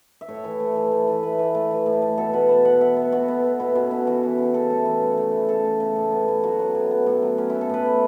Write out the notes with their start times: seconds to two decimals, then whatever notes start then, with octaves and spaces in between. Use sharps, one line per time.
0.21 E5
0.29 A2 C#5
0.44 E3
0.60 A3
0.76 E3
0.92 A3
1.08 E3
1.23 A3 B4
1.39 E3
1.55 A3
1.71 E3
1.86 A2
2.02 A3
2.18 B2 A4
2.33 B2 B4
2.49 B3 A5
2.65 B2 F#5
2.81 B3 E5
2.96 B3
3.12 B2 F#4
3.28 B3
3.44 B3
3.60 B2 E4
3.75 B2 C#4
3.91 B2 E4
4.07 E3 F#4
4.23 E3
4.39 C#3
4.54 C#3 A4
4.70 A3
4.86 E3
5.01 C#3
5.17 A3
5.33 E3
5.49 C#3 A4
5.64 A3
5.80 C#3
5.96 A2
6.12 B3
6.28 A2
6.44 F#3 F#4
6.59 B3
6.75 A2
6.91 B3
7.06 A2
7.23 F#3
7.38 B3 C#4
7.50 B3 E4
7.61 A4
7.69 A2 B4
7.86 A3